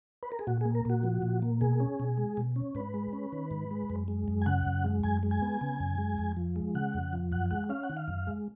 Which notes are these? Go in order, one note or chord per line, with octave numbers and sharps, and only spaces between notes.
B4
A#4
G#4
A#2 F#4
A#3 G#4
A#4
A#2 F#4
F3
A#2
A#3
B2 G#4
C#4
B2
G#3
B2
C#4
G#2 B4
G#3
C#4
D#3
G#2
G#3
F#2
G#3
F#2
G#5
C#3 F#5
F#2
G#3
F#2 G#5
G#3
G#5
B3
C#3
F#2
G#3
F2
F3
G#3
C#3 F#5
F2
F3
F#2 F#5
G#3 F#5
C#4 F5
F#5
D#3
F5
F#2
G#3